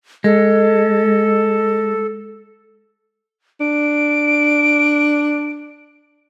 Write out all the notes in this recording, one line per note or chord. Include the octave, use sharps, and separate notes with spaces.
G#3 A4
D4 D7